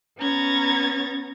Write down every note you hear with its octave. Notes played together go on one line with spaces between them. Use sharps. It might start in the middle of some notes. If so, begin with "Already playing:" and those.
B3 C#4 A#5 G#6 A6